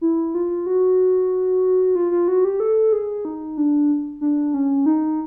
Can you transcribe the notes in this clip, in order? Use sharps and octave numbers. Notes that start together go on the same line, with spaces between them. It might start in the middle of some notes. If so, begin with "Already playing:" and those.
E4
F4
F#4
F4
F4
F#4
G4
A4
G#4
D#4
D4
D4
C#4
D#4